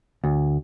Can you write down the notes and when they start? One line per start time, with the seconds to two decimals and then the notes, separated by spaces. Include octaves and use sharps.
0.24 D2